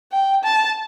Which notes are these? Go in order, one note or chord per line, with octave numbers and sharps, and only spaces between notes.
G5
A5